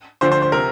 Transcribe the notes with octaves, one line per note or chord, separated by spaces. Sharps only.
D2 D3 F3 C5
C5
C5
C3 F3 A#4